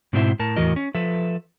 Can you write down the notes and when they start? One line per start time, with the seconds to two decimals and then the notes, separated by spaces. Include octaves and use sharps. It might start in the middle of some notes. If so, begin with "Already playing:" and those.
0.13 G#2 B2 C4 E4 C5 E5
0.39 A2 A#4 A5
0.56 E2 A2 E3 F#4 A#4 D#5
0.76 C#4
0.95 F3 A4 B4 E5